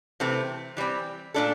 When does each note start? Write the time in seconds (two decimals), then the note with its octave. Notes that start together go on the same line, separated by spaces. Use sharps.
0.20 C3 E3 A3 C4
0.77 E3 G3 C4
1.34 A#2 A3 D4 A4